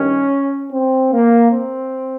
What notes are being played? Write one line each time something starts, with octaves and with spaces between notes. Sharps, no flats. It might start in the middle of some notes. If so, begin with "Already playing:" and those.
Already playing: G2 D#3 C#4
C4
A#3
C4